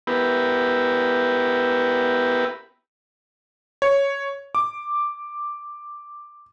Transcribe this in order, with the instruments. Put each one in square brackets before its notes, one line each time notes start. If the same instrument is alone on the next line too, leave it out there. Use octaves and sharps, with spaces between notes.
[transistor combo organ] B3 E4 G4 A#4 B4
[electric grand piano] C#5
D6